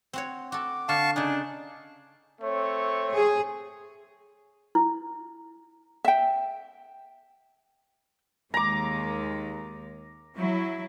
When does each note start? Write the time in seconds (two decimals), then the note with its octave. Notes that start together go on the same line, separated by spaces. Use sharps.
0.13 C4 F#4 C#5
0.52 F#4 A4 D6
0.89 D3 F5 A5 C#6
1.16 C#3 D4 D#4 G#5
2.41 A3 C4 C#5
3.11 G#4
4.75 E4
6.05 E5 G5
8.54 D#2 G#3 A#5 D6
10.36 F#3 E4